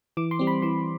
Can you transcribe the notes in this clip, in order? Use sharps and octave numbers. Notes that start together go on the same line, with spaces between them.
E3 D6
C6
G3 C4
B5
E3 C6